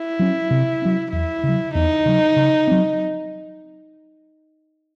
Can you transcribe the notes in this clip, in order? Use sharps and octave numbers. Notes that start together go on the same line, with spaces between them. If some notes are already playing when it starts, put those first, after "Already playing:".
Already playing: E4
F#3 C#4
C3
F#3 C#4
E2 E4
C#3
F#3
E2 D#4
C#3 F#3
C#3
F#3 C4